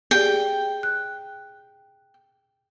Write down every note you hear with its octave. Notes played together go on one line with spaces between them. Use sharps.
G4 G#4 D5 G5
F#6